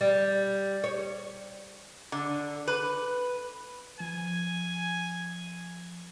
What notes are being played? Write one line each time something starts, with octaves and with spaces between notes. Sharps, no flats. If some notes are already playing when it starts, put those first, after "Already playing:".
G3
C#5
D3
B4
F3 G#5